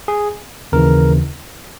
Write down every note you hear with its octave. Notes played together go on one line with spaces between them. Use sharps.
G#4
D#2 C#3 E3 A#4